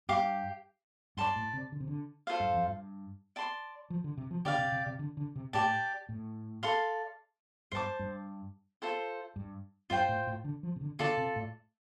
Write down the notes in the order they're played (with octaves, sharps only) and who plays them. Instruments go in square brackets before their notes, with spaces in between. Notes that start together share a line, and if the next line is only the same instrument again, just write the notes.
[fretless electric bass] G2 [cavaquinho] G4 F5 D6
[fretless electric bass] G2 [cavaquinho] D5 A5 C6
[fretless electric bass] A2
C3
D3
C3
D3
[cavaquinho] F4 A4 C5 F5
[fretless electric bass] G2
F2
G2
[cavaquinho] D5 A5 C6
[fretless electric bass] F3
D3
C3
F3
[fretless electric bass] D3 [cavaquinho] G4 D5 F5
[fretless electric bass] C3
C3
C3
D3
D3
C3
[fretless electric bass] A2 [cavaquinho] G4 D5 A5
[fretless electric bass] A2
[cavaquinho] A4 D5 F5 C6
[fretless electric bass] G2 [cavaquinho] C5 A5 D6
[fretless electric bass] G2
[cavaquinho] F4 A4 C5
[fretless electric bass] G2
[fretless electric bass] G2 [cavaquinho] F4 C5 G5
[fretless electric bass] A2
A2
D3
F3
C3
D3
[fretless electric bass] D3 [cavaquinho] F4 A4 D5 A5
[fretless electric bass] C3
A2